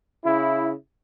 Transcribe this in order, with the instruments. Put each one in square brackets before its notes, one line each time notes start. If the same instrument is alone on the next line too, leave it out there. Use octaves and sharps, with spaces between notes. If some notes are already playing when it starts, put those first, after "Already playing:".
[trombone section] C#3 E4